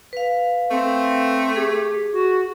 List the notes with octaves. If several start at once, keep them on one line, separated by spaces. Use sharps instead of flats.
B4 F5
A3 C4
G4 G#4
F#4